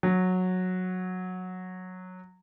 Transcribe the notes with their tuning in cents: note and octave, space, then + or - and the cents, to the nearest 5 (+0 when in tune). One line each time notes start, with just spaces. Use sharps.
F#3 -10